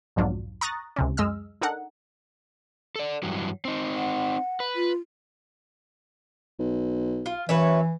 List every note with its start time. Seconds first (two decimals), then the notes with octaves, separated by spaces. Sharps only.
0.16 B1 F2 G#2 F#3 D4 F4
0.61 A#5 C#6 D#6 F#6 A6 A#6
0.96 C#2 C3 C#4
1.17 F#2 G#3 D#5 E6 F6
1.61 D4 D#4 A4 A#4 F#5
2.96 A4 D5
3.23 G2 E3 F#3
3.65 C4 D#4
3.96 F#5
4.60 B4
4.76 F4
6.59 B1
7.26 F4
7.49 F#2 E3 B4 C#5 E5